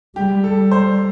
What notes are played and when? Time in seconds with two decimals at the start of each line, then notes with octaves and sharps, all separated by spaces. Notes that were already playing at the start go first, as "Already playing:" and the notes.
0.16 G3 G4
0.44 A4
0.58 G3
0.71 C5